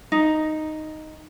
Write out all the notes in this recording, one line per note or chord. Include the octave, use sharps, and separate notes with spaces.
D#4